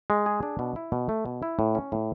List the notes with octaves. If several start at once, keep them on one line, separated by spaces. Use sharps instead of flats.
G#3
G#4
D4
B2
E4
B2
A3
B2
E4
A2
C#4
A2